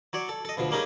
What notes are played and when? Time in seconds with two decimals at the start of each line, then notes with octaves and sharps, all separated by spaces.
0.13 F#3 C#5 D5
0.29 A4
0.45 A4 D#5
0.57 D2 B2 F3
0.71 G3 A#3 C#4 D#4 G#4